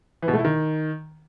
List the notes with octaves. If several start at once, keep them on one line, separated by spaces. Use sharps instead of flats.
E3
B2
A3
E4
D#3